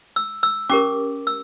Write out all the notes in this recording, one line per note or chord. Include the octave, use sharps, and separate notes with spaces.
E6
E6
C#4 G4 A#4 D6
E6